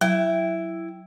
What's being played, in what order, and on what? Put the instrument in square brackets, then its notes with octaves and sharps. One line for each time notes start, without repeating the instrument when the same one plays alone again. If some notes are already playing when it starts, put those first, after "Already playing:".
[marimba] F#3 [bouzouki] E4 G5